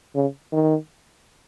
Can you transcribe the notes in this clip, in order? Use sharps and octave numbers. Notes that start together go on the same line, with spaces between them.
C#3
D#3